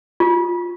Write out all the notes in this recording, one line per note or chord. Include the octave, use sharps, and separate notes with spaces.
F4